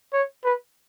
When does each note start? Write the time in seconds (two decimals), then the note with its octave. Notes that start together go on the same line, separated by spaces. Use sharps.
0.13 C#5
0.44 B4